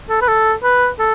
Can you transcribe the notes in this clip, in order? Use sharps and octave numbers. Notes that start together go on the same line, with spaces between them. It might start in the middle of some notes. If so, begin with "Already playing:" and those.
A4
B4
A4
B4
A4